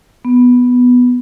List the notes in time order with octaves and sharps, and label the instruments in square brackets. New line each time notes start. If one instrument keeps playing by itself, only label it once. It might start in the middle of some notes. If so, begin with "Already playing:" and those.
[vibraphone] B3